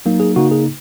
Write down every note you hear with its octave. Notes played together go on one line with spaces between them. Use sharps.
F#3 A#3 D#4
G#4
C#3 A#3 D#4 F#4
G#4